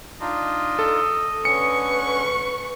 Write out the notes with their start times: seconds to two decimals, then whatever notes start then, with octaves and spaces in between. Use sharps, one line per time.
0.21 D4 D#4 F4 D#5
0.79 A4
1.45 D3 C#4 B4 C#6 C#7